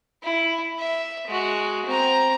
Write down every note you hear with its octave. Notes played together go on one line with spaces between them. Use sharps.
E4
E5
G#3 F#4
C4 A#5